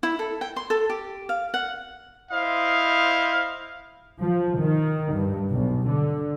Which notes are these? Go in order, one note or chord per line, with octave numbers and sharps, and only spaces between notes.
E4
A4
G5
C6
A4
G4
F5
F#5
E4 C5 D#5 F5
F3
D#3
G2
B1
D3